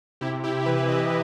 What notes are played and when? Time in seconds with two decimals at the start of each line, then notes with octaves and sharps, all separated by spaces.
0.21 C3 E4 G4
0.44 C3 E4 G4
0.66 E3 G4 B4
0.88 E3 B4 D#5